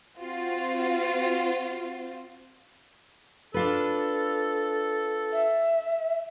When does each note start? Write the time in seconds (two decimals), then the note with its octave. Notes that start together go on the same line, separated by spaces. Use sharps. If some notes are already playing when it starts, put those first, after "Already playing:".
0.17 C4 F4 F#4 C5
3.54 D4 F4 A4 B4
5.33 E5